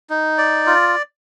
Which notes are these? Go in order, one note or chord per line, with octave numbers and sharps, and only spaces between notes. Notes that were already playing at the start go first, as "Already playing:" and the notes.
D#4
D5
F4